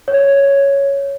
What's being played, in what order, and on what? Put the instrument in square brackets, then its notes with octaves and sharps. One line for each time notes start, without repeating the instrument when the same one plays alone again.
[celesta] C#5